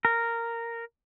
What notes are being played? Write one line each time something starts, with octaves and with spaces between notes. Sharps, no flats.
A#4